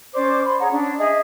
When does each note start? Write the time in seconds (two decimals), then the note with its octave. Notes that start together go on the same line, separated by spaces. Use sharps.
0.14 C#4 C5 D5 D6
0.43 B5 C6
0.59 G#4 C#5 F#5 A#5
0.71 C#4 D4
0.98 G#4 D#5 E5